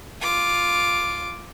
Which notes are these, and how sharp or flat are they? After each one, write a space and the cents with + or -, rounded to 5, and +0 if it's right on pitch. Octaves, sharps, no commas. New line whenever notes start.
F4 +0 D6 +0